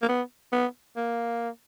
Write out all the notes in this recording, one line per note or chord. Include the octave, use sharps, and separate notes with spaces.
A#3
B3
B3
A#3